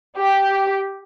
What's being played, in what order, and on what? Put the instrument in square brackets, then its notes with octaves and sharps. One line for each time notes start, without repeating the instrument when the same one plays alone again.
[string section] G4